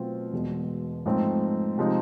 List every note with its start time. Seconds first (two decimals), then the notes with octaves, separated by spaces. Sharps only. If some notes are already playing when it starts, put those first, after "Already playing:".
Already playing: B2 F#3 A3 C4 F4
0.33 E1 E2 B2 G#3
1.06 G#2 F3 A3 C4 D#4
1.77 C3 F3 G#3 C4 D#4